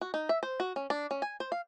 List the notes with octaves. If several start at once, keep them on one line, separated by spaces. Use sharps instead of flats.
F#4
D#4
E5
C5
F#4
C#4
D4
C#4
G#5
C5
F5